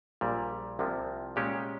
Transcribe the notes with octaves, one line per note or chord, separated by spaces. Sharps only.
A#1 A#2 G3
C2 C3 F3
A#2 G#3 C#4 G4